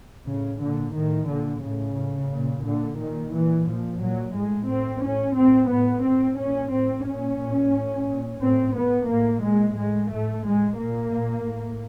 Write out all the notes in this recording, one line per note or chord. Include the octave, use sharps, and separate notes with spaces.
A2 C#3
A#2 D3
A2 D#3
A#2 D3
A2 C#3
A2
A#2
A#2 D3
A#2 D#3
A#2 E3
A#2 F3
A#2 F#3
A2 G#3
A2 C4
A2 C#4
A2 C4
A2 B3
A2 C4
A#2 C#4
A2 C4
A#2 C#4
A#2
A2
A#2
A2 C4
A2 B3
A2 A#3
A#2 G#3
A2 G#3
A2 A3
A2 G#3
A#2 A#3
A#2
A2